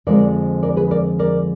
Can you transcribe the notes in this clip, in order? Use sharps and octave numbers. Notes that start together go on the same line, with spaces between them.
F2 D3 F3 G#3 A#4 D5
A#4 D5
G#4 B4
A#4 D5
A#4 D5